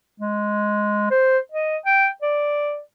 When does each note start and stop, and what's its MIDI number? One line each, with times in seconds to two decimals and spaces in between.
0.20 1.09 56
1.10 1.38 72
1.52 1.77 75
1.85 2.08 79
2.22 2.80 74